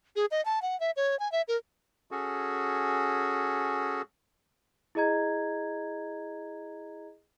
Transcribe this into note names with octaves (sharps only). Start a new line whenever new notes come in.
G#4
D#5
A5
F#5
E5
C#5
G#5
E5
A#4
C#4 F#4 G#4 A4
E4 G#4 D#5 A#5 G#6